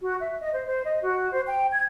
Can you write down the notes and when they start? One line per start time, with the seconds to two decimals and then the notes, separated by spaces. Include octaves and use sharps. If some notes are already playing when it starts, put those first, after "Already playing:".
0.02 F#4
0.19 E5
0.40 D#5
0.52 C5
0.66 C5
0.84 D#5
1.02 F#4
1.31 C5
1.47 G5
1.71 G#6